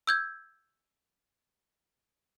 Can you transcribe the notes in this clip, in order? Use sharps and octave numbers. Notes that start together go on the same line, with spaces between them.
E6 G6 G#6